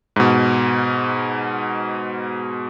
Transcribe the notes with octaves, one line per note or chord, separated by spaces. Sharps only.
G#2 B2